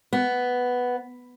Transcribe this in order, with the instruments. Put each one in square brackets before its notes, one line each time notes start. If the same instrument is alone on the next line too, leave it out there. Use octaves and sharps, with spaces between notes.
[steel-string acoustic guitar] B3